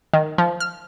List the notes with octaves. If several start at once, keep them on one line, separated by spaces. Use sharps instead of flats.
D#3
F3
F6